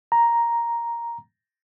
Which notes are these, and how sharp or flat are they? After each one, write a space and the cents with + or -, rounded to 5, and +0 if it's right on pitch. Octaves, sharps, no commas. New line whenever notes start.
A#5 +5